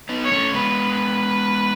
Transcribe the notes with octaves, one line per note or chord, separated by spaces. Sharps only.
B3 D#4
C#5
A3 C#4
G#3 B3 B4